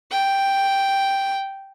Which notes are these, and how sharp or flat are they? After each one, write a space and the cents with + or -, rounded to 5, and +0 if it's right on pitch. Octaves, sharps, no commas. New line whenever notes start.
G5 +0